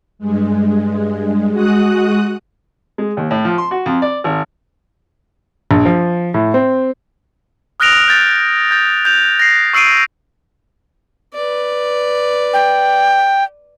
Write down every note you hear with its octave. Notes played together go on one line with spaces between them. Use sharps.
G2 G#3
G#3 F#4 D#6 F#6
G#3
D#2
A2
F3
C6
F#4
F2
D5
G#1
A#1
F3
A2
C4
D#6 F6 F#6 A#6 D7 F7
G6 A6
G6 A6
G6 F7
A#6 C7
C#6 E6 C7 D7 D#7
B4 D5
G5